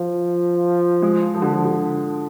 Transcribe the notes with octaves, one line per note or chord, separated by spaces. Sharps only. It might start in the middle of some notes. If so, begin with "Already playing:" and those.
Already playing: F3
G#3
F3
D3
F3
D3